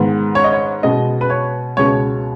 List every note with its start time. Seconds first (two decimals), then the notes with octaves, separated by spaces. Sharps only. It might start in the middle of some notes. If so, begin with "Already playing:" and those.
Already playing: G#2 D#3 G#3 B3
0.35 C#5
0.44 D#5
0.53 C#5
0.83 B2 G#3 B3 D#5
1.21 B4
1.30 C#5
1.77 C#2 B2 G#3 B3 C#5